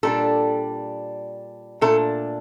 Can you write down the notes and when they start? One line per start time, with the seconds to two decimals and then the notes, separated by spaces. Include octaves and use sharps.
0.03 A#2 G3 D4 A4
1.81 A#2 A3 D4 A4